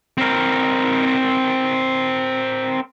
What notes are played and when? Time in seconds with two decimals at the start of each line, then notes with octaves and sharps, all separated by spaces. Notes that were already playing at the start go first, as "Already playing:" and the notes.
0.18 C4 A#4